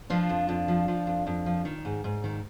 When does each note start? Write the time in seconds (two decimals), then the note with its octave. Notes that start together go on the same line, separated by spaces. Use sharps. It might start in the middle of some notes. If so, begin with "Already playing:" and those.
0.10 F3 D4 F4
0.29 F2
0.49 F2
0.68 F3
0.88 F3
1.07 F2
1.27 F2
1.46 F3
1.65 D#3
1.85 G#2
2.04 G#2
2.24 D#3